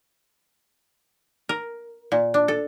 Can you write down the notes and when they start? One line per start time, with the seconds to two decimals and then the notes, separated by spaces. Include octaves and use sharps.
1.49 A#4
2.12 A#2
2.34 D4
2.48 A4